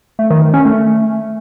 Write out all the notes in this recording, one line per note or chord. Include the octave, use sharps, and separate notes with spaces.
A3
D#3
D#3
C#4
A3